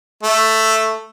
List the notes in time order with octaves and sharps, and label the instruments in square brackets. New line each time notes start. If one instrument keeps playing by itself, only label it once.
[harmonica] A3